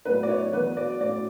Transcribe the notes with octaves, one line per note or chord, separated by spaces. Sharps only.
A2 F#3 B3 D4 B4
D5
C#5
E2 B2 F#3 B3 D4 B4
D5
A2 F#3 C#4 D5